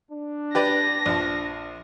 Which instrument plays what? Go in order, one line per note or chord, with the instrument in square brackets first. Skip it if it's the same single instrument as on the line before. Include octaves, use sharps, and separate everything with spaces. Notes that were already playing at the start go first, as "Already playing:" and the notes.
[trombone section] D4
[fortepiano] G4 B4 D5 [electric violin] A#6
[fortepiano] A#1 F3